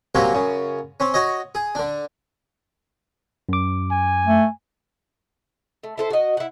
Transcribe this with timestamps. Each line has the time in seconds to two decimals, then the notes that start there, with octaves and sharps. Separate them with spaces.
0.15 C3 F#3 G3 A#3 C4 C#4
0.34 F#2 C#3
1.00 C4 C#4
1.14 F#4 C#5 D#5
1.55 G#4
1.75 D3 D4
3.49 F#2 D6
3.91 G#5
4.25 A3
5.84 A3
5.98 E4 A4 C5
6.10 F#4 D#5
6.37 E4 F#5